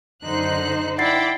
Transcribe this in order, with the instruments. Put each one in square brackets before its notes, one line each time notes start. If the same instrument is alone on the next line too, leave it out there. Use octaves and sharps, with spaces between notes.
[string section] F#2 D3 F#6 [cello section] D#4 C5
[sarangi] E4 [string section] D5 G5 [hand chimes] F#5 A6 C7